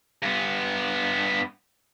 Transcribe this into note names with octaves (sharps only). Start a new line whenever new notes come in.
G2 B3